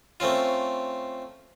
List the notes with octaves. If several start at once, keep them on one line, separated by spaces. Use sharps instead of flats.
A3 C4 C#4 F4